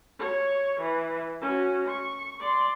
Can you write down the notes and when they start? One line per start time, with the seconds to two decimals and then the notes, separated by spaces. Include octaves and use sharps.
0.19 C#5
0.80 E3
1.41 C#4 F#4
1.86 C#6
2.40 D5 C6